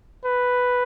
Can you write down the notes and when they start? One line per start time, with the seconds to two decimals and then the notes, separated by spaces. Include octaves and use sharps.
0.25 B4